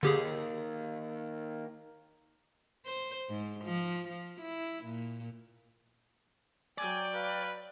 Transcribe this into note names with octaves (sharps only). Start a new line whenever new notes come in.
D#2 D3 G4 G#4
C5
G#2
F3
F3
E4
A#2
F#3 D5 G5 G#5
B4 F5